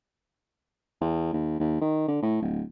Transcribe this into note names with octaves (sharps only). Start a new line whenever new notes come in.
E2
D#2
D#2
D#3
D3
A2
D1